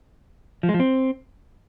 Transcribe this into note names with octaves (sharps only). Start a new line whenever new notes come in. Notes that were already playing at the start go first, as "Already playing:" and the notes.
F3
G#3
F3
C4